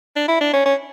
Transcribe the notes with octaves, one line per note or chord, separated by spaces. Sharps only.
D4
E4
D4
C#4
C#4